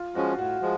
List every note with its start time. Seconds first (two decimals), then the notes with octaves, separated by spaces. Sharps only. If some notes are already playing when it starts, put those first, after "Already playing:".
Already playing: F4
0.15 F3 G#3 C#4 F#4
0.39 A2 F#4
0.62 F3 G#3